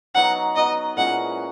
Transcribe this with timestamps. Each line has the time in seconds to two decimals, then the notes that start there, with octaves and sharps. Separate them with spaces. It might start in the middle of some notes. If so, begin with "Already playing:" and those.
0.15 F#3 B3 D#4 F#4 F#5
0.56 F#3 B3 D#4 F#4 D#5
0.97 A#2 G#3 C#4 E4 F#5